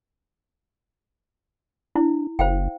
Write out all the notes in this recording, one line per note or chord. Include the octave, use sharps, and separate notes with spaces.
D4 E4
F#1 C5 F5 G5